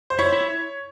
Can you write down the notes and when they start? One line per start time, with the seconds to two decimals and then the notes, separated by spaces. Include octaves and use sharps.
0.10 C5
0.19 E4 C#5
0.33 E4